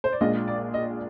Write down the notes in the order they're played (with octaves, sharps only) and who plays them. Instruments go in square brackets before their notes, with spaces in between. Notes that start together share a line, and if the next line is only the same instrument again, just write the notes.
[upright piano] C5
D5
[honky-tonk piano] A#1 A#2 G#3 D4 F4 [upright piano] D#5
[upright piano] D5
D#5